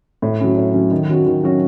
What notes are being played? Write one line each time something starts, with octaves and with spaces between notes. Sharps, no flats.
A2
F#3 C#4
A2
F#3 C#4
D#3
F#3 C#4 F#4
D#3
F#3 C#4 F#4